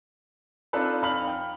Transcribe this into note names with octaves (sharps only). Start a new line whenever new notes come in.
C4 D4 D#4 F4 A4 B4
F2 D#4 F5 B5 F6 F#7
G5